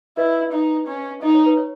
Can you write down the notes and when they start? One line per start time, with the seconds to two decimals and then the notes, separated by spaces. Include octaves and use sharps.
0.17 E4 B4 D#5
0.52 D#4
0.87 C#4
1.22 D#4 D#5
1.35 C#5
1.46 B4
1.57 C#5